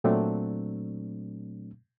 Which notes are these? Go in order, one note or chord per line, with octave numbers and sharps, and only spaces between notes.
A#2 F#3 A3 C4 D4